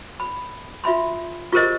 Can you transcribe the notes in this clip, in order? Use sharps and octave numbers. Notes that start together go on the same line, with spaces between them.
B5
F4 E5 B5 C6
F4 G4 G#4 A#4 C5 D#5